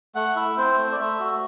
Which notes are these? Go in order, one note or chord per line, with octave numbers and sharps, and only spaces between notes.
A3 F#5
E4 E5
C4 C5
A3
D5
A3 E5
F#4